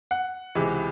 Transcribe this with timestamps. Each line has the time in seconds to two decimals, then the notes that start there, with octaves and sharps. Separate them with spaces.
0.11 F#5
0.55 C#2 C3 E3 G#3